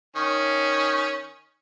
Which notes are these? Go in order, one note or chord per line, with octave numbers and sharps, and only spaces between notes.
D#3 C#4